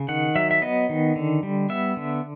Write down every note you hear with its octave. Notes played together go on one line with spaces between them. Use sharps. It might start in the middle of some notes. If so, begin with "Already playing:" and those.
Already playing: C#3
D#3 F#5
F#3 E5
E5
B3 D#5
D#3
D3
G3
B3 E5
D3